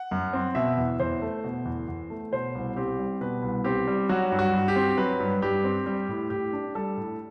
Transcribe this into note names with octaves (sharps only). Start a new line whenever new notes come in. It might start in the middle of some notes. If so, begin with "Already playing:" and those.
Already playing: F#5
F#2
C4
B2 E5
E2
E2 C5
A3
B2
E2
E2
A3
B2 C5
C2
C4 G4
G3
B2 B4
C2
C4 G4
G3
F#3 F#4
G2
F#4
G2
G4
C4
F#3 B4
G2
G2 G4
C4
G3 G4
A2
A2 G4
D4
G3 A4
A2